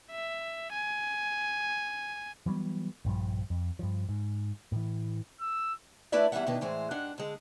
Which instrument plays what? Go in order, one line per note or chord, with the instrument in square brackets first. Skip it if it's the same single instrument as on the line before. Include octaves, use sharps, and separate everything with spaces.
[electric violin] E5
G#5
[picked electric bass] E3 F#3 G3 B3
A#1 G2 C#3 F3
F2
G2 F3
G#2
A2 E3
[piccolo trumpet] E6
[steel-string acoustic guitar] A3 D4 E4 B4 D5 E5
E2 E3 G3 A3 E5 F#5
B2 D#3 D4 E4 B4
A2 E3 G#3 C5
G2 G#3 D4 F#5
D3 G#3